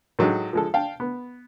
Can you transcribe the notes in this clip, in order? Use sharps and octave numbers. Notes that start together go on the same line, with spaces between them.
A2 F#3 G#3 D#4
F3 G#3 A4
F5 G5 A5
B3